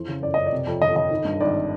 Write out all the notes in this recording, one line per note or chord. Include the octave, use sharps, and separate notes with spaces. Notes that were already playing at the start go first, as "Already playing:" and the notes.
Already playing: F2 E3 C5
C#3
F#2 D5
F#2 D#5
D5
C3
F2
G1 D#5
G1 D#5
D#3
G2
G#1 D5